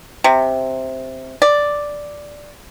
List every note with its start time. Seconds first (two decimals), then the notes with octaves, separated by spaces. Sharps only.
0.24 C3
1.42 D5